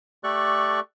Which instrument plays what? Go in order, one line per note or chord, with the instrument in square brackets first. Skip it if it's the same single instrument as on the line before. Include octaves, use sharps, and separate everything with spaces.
[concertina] A3 G4 A4 D5 C#6 F#6